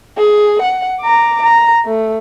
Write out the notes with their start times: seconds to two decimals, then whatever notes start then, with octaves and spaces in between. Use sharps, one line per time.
0.17 G#4
0.62 F#5
1.01 A#5 D6
1.42 A#5
1.86 A3